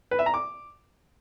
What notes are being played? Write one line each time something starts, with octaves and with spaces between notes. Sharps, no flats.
B4
E5
A#5
D6